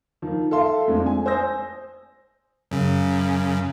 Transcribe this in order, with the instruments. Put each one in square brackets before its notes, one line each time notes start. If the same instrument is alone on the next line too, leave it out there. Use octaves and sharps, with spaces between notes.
[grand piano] D#3 F3
A4 E5 F5 C6
F2 F3 G#3 A3 D4
G#5
C5 G#5 D#6 E6 G6 A#6
[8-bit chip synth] F#2 C#3